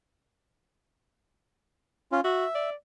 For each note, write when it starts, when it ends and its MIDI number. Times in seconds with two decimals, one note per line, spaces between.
2.12 2.21 61
2.12 2.21 65
2.24 2.45 66
2.24 2.70 76
2.55 2.75 74